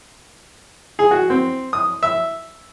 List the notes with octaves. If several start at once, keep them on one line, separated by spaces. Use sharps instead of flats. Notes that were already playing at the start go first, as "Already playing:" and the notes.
G#4
F#4
C4
D#6
E5